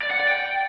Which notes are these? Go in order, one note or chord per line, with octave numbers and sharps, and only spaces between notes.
D5
F#5
D5
G5